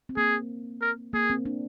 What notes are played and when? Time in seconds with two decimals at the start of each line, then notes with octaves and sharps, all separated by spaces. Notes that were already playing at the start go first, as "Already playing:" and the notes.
0.09 C4
0.17 A#3 G#4
0.81 A#4
1.13 A#3 G#4
1.30 C4
1.45 D4